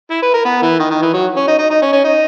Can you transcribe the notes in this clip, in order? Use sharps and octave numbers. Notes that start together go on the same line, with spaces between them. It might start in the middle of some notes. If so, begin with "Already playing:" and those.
E4
B4
A#4
B3
E3
D#3
D#3
E3
F#3
C#4
D#4
D#4
D#4
C#4
C#4
D#4